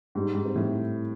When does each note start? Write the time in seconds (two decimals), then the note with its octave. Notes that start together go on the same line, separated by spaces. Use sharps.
0.15 G#2 G3
0.35 G#2
0.45 C4
0.56 A2